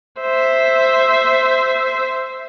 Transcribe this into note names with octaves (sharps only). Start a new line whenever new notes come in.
C5 E5